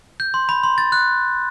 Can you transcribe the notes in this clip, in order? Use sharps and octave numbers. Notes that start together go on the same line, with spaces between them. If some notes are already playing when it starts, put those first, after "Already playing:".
G6
C6
B5
C6
A6
F#6